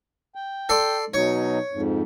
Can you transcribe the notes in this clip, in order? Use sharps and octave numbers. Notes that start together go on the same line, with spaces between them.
G5
A4 D5 C6
B2 F#3 D#4 C#5
F2 G#2